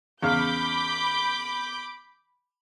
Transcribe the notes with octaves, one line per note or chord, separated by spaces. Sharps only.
E2 C#3 F5 B5 D6 G6